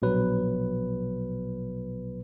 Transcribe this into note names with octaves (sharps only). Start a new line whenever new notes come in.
A#1 B2 F#3 B4